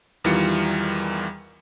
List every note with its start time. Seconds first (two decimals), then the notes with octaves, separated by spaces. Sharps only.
0.24 E2 D#3 E3 G3 F4 C#7